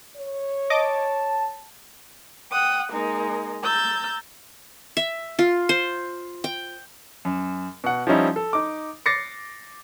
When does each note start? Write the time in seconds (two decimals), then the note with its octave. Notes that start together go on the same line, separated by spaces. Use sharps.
0.16 C#5
0.70 D#5 A5 D6
2.51 F#5 G5 D#6
2.92 G#3 A#3 D#4
3.63 A#5 E6 G6 A6
4.97 E5
5.39 F4
5.69 C5
6.44 G5
7.25 F#2
7.84 B2 F#5
8.07 F3 G3 C#4 D#4 E4
8.36 A4
8.53 D#4 D6
9.06 D6 A6 A#6 C7 C#7